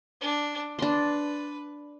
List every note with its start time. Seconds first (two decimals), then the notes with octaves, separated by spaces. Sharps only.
0.21 D4
0.79 D4 B4 C6